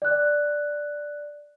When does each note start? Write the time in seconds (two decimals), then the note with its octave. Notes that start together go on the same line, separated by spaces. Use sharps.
0.02 D5 F#6